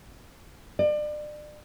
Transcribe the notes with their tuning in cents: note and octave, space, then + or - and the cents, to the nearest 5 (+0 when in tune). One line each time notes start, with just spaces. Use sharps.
D5 +35